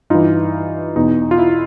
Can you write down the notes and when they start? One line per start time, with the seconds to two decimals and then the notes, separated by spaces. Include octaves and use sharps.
0.10 G2 E3 D#4 F4
0.96 E2 B2 D#4
1.31 F4
1.39 E4